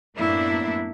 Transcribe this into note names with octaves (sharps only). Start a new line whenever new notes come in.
F#2 A2 A#3 B3 D4 E4